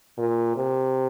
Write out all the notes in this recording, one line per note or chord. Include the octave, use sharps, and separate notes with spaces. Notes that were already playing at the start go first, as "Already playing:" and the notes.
A#2
C3